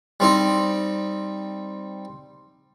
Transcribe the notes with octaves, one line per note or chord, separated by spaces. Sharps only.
G3 C4 D#4